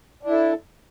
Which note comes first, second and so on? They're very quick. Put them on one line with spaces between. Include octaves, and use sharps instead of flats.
D4 E4 A4